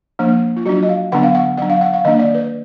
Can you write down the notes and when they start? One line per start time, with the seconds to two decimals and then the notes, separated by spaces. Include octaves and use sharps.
0.19 F3 A#3 D4
0.57 F4
0.66 F#3 D4 F#4
0.83 D#5
0.89 F5
1.12 D3 F#3 B3 D4 F#5
1.23 F5
1.35 F#5
1.57 F#3 D4 F#5
1.70 F5
1.81 F#5
1.93 F5
2.05 D#3 A#3 D4 D#5
2.19 D5
2.35 B4